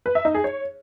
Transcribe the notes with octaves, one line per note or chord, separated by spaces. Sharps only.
B4
E5
D#4
G#4
C#5